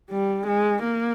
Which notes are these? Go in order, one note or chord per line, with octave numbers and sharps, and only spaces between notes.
G3
G#3
A#3